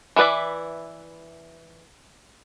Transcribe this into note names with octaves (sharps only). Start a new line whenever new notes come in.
E3 E4 B4 D5 E5